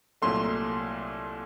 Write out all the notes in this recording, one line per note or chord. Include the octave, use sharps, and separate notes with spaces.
C2 A#2 F#3 A3 C6